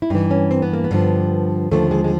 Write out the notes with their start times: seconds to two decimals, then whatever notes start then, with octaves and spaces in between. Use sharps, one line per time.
0.02 E4
0.10 G2 E3 D#4
0.31 C#4
0.51 C4
0.62 B3
0.73 A#3
0.84 B3
0.91 G2 D3 F3
1.71 D#2 D3 F3 A3
1.91 G#3
2.04 G#3